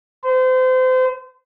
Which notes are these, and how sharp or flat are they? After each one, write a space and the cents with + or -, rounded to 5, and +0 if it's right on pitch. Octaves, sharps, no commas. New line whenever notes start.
C5 -30